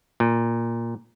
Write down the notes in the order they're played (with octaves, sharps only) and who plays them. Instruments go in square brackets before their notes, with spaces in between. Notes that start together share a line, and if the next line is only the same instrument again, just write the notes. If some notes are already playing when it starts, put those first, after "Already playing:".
[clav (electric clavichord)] A#2